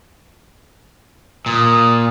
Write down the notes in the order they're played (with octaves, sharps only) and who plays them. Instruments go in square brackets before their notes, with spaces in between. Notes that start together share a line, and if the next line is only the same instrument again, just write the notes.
[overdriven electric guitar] A#2 [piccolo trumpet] D#6